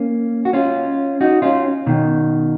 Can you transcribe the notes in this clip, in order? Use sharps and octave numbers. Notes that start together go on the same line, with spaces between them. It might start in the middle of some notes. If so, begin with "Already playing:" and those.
Already playing: A#3 C#4
F#4
C#4 F4
D#4 F#4
C#4 F4
B2 D#3